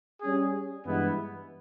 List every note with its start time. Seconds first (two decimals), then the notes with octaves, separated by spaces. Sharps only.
0.21 G3 C#4 G#4
0.84 G2 E3 G#3 B3 E4